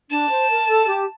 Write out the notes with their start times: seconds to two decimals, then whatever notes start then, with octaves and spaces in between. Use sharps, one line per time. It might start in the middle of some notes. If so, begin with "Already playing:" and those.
0.10 D4 A5
0.30 C5
0.50 A#4
0.68 A4
0.87 G4